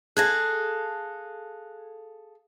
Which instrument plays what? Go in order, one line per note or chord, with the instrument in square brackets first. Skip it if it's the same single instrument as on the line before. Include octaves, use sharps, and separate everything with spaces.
[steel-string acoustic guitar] G#4 A4 F5 [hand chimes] F#6 G#6 A#6